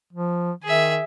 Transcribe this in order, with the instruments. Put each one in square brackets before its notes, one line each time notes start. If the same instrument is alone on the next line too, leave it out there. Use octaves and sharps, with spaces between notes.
[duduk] F3
[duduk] D#3 [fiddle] G#4 E5